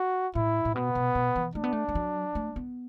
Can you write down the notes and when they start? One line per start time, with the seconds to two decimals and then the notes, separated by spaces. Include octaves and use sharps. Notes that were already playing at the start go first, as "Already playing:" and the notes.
Already playing: F#4
0.35 A2 E4
0.65 A2
0.75 B2 B3
0.95 B2
1.15 B2
1.36 E3
1.55 A3 D4
1.64 B3
1.72 A3
1.89 A3
1.95 F#3
2.35 A3
2.56 B3